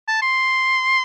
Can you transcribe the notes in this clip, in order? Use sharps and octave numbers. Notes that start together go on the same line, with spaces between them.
A5
C6